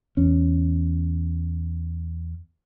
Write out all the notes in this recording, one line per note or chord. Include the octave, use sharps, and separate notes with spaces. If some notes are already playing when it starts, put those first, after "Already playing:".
E2 C#4